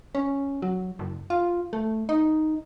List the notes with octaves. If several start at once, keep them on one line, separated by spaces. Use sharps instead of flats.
C#4
F#3
F#1
F4
A3
D#4